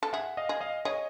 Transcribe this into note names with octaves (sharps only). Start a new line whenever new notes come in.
A4
G#4 E5 F#5
D#5 F5
G#4
D#5 F5
G#4 C#5 D#5